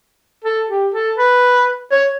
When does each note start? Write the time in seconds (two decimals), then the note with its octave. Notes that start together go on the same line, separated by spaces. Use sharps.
0.45 A4
0.69 G4
0.94 A4
1.18 B4
1.92 C#5